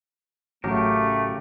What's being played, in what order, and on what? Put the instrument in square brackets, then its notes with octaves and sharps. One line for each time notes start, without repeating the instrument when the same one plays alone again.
[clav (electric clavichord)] A1 F#3 [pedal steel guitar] C#3 G4 A#4 [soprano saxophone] A3